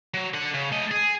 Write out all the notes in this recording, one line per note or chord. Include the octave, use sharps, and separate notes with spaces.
F#3
D3 F#5
C#3
A3 D#5
G#4